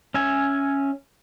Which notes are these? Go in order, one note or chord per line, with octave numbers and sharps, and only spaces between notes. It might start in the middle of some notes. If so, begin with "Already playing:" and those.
C#4 E5 G#5